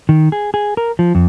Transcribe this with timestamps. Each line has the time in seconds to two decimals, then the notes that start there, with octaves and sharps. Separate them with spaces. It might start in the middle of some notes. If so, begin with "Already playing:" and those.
0.09 D#3
0.32 G#4
0.54 G#4
0.77 A#4
0.99 F3
1.15 F2